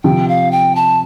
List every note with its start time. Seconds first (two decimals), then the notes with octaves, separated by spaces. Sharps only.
0.04 C3 F3 G5
0.28 F5
0.52 G5
0.75 A5